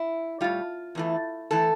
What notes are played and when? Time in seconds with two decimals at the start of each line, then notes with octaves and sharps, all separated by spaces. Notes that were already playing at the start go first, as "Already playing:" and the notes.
Already playing: E4
0.41 A2 G3 F4
0.95 E2 E3 A3
1.51 E3 A3 A4